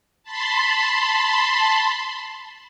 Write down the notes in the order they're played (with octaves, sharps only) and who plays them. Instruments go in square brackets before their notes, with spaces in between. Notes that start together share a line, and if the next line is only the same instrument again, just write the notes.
[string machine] A5 B5 C6